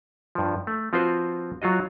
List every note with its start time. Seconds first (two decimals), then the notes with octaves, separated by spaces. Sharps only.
0.35 G2 F3
0.67 A3
0.93 F3 C4 F4 F#4 B4 C5
1.62 F#3 F4 F#4 D#5